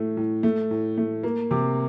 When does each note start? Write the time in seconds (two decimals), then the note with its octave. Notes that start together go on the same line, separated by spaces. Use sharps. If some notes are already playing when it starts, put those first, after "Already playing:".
Already playing: A2 A3
0.17 A2
0.43 A3
0.71 A2
0.97 A3
1.23 A#3
1.51 C3 D6